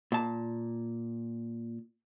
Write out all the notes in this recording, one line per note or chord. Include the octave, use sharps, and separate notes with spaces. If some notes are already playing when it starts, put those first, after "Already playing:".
A#2 A5